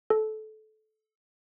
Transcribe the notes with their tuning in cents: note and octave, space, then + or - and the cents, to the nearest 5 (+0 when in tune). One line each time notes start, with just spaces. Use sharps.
A4 -20